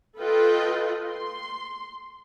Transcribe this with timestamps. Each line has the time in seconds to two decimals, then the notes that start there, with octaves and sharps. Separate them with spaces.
0.18 F4 A4 B4 D#5 G5
1.08 C6